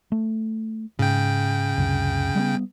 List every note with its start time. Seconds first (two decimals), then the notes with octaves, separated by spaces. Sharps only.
0.12 A3
0.99 G#2 C#3 G5
1.77 C#2 F#2 C3
2.35 G3 G#3 B3